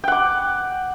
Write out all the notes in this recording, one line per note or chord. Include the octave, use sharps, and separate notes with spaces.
F#5 G5 D6